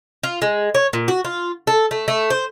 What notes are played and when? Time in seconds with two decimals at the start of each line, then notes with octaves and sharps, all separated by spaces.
0.23 F4
0.42 G#3
0.74 C#5
0.93 A#2
1.08 F#4
1.25 F4
1.67 A4
1.91 A3
2.08 A3
2.30 C5